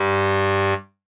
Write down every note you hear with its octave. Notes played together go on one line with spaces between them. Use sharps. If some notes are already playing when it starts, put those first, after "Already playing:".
Already playing: G2 G3